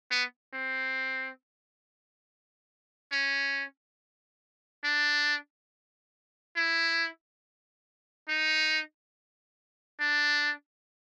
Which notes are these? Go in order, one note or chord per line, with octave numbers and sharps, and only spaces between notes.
B3
C4
C#4
D4
E4
D#4
D4